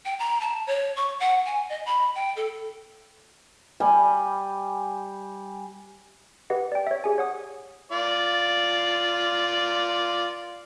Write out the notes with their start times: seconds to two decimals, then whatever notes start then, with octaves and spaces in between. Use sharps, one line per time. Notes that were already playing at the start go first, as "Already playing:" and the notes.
0.05 G5
0.19 A#5
0.41 A5
0.67 C#5
0.96 C#6
1.20 F#5
1.46 G#5
1.69 D#5
1.86 B5
2.15 G5
2.37 A4
3.80 G3 G#5
6.50 G4 B4 D#5 F#5
6.72 D5 G5
6.87 C#5 E5
7.04 G4 G#4 G#5
7.18 C#5 F#5 D#6
7.92 F4 D5